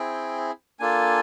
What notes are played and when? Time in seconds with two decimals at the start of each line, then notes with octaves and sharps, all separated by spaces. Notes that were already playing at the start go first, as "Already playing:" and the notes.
Already playing: C4 E4 G#4 G5
0.79 A#3 D4 F4 A4 G#5